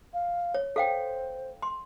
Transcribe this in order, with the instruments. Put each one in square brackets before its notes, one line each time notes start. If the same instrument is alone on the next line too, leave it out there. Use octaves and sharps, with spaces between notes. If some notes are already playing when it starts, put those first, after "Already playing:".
[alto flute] F5
[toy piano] C#5
[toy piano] A4 F5 G5 [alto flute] C5
[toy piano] C6